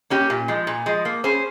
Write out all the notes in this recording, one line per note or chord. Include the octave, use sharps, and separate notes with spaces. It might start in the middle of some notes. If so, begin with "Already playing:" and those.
A#3 C#4 G4
A#2
F3 G#3
A#2
F3 G#3
A#3
C#4 G#4 C5